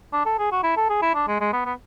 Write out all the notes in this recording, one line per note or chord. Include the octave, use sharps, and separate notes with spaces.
D4
A4
G#4
F#4
E4
A4
G#4
E4
D4
G#3
G#3
B3
B3